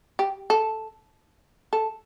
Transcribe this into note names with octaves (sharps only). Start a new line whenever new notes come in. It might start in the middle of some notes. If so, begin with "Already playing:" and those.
G4
A4
A4